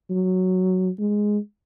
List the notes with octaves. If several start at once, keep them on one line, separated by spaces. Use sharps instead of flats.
F#3
G#3